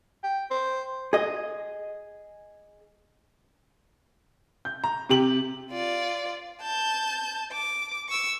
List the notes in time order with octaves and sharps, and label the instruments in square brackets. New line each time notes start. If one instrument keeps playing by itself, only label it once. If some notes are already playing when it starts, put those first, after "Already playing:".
[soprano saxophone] G5
C5
[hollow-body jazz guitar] G#4 D#5
[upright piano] G6
A#5
C3 G4 F#7
[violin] F4 D5
A5 G6
D6
C#6 E6